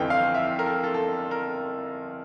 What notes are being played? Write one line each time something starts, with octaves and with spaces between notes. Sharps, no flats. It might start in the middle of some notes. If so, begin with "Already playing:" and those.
Already playing: G1 F2 E3 G5
F5
E5
A#4
A4
A4
A4
A#4